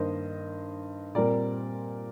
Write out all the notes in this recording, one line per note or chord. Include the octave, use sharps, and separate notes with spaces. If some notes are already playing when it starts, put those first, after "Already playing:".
Already playing: G2 D#3 A#3 C5 D#5
A#2 G3 C4 A#4 D5